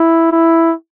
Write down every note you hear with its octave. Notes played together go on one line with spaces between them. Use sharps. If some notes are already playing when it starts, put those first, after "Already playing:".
Already playing: E4
E4